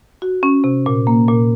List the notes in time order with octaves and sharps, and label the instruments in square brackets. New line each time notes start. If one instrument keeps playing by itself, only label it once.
[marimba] F#4
C#4
C3
A#2
A#3
A#2